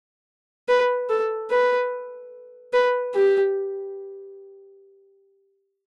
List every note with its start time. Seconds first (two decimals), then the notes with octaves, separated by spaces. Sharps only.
0.69 B4
1.09 A4
1.50 B4
2.73 B4
3.14 G4